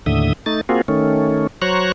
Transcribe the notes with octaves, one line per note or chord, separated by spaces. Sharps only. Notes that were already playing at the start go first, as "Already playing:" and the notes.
D#2 A2 D3 E5 D#6
A3 D#4 A6
A#3 C4 F4 F#4 G#4
D#3 A3 C#4
F#3 C5 C#5 A#5 C#6 F#6